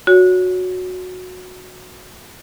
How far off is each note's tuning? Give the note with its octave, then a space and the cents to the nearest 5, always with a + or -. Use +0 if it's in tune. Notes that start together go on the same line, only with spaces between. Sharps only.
F#4 -15 C#5 +25